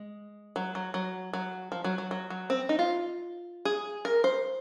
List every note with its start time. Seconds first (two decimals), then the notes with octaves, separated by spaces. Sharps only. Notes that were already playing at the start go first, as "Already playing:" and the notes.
Already playing: G#3
0.56 F#3
0.75 F#3
0.94 F#3
1.33 F#3
1.72 F3
1.84 F#3
1.98 F#3
2.11 F#3
2.30 F#3
2.50 C4
2.69 D#4
2.79 F4
3.65 G#4
4.05 A#4
4.24 C5